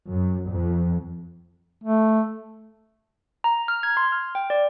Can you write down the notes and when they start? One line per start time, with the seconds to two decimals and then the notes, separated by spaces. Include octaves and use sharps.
0.12 F#2
0.50 F2
1.84 A3
3.44 A#5
3.68 F6
3.83 G#6
3.97 C6
4.12 F6
4.35 G5
4.50 D5